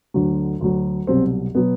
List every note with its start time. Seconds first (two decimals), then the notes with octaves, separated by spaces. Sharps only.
0.14 D2 D3 F#3
0.61 D2 D3 F#3
1.07 C2 B2 F#3 C4
1.55 B2 F#3 B3